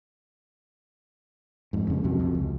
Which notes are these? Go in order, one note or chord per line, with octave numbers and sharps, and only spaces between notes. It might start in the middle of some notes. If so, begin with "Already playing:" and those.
F2 G#2
F2 C#3
B1 F2 C3 F#3
F2
C#2